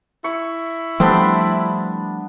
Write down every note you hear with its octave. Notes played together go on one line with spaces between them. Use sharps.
E4 C#6
F3 G3 A3 B3 C4 D4